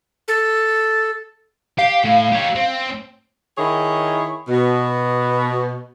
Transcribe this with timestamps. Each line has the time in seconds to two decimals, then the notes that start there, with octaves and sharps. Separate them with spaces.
0.28 A4
1.79 G4 F5
2.04 A2
2.32 G4 C#5
2.55 C4
3.58 D#3 E4 G#4 C#5
4.48 B2